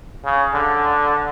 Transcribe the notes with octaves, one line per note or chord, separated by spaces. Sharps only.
C#3
D3